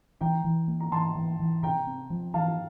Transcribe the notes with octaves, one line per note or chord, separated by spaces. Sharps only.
E3 G5 A#5
E3
A#3
A#5
E3 A5 C6
E3
E3
C3 G5 A#5
C4
F3
E3 F5 A5